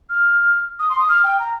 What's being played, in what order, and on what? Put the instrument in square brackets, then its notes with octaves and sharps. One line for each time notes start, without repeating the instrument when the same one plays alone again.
[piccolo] F6
D#6
C6
D#6
F6
G5
A#5